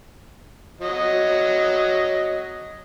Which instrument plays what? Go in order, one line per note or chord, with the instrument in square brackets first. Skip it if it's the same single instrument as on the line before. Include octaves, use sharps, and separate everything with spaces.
[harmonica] F#3 D#5